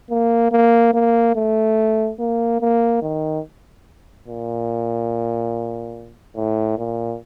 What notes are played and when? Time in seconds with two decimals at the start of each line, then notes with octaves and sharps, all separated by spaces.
0.10 A#3
0.51 A#3
0.94 A#3
1.36 A3
2.19 A#3
2.60 A#3
3.02 D#3
4.27 A#2
6.36 A2
6.78 A#2